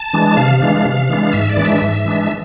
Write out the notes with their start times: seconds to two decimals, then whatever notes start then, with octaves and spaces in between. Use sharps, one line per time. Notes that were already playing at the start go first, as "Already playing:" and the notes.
Already playing: A5
0.13 E3 G#3 D4
0.37 C3 F5
0.62 E3 G#3 D4
0.85 C3
1.09 E3 G#3 D4
1.33 G#2 E5
1.49 D5
1.57 E3 G#3 D4
1.65 E5
1.82 G#2
2.05 E3 G#3 D4